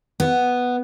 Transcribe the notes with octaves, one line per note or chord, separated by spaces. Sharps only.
B3